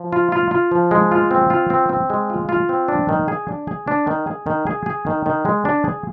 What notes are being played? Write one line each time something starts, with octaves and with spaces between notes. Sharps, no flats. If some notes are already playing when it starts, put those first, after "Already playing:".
Already playing: F3
F4
F4
F4
F3
G#3
F4
C4
F4
C4
C4
G#3
F4
F4
C4
D4
D#3
G#4
D4
G#4
D4
D#3
G#4
D#3
G#4
G#4
D#3
D#3
G#3
D4
G#4